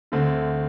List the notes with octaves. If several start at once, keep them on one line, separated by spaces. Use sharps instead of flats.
D2 D3 A3 C4